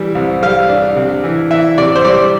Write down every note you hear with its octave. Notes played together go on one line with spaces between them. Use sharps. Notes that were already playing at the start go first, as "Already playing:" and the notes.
Already playing: E3 G3
C2
G3 F5
D4
C3
E3
E3 E5
C3 D5
C5
G3 D5